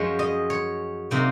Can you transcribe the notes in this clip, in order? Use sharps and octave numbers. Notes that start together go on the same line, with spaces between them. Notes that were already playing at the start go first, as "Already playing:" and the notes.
Already playing: F#2 F3 G#3 C#5
D#5
C#5
C3 F#3 A#3 D#4